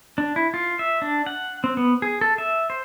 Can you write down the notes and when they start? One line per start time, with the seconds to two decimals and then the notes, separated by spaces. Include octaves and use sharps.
0.18 D4
0.36 E4
0.54 F4
0.79 E5
1.02 D4
1.26 F#5
1.64 C4
1.77 B3
2.02 G#4
2.21 A4
2.38 E5
2.70 C5